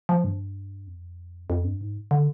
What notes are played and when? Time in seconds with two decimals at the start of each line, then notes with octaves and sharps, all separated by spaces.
0.09 F3
0.24 G2
0.87 F2
1.50 F2
1.64 G2
1.81 G#2
2.11 D3